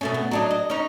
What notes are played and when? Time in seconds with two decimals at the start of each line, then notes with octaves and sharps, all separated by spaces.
0.01 B2 A3 C#4
0.14 B3
0.31 F#3 D4 D#4
0.51 D#5
0.70 C#4 D#4